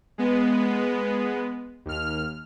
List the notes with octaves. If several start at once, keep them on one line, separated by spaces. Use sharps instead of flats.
G#3 B3
D#2 F6